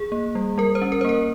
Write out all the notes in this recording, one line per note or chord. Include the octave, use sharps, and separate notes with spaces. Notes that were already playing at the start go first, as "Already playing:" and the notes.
Already playing: G#4
A#3
G3
G3 A#4
C5
C#4
A#4
C5
A#3 A#4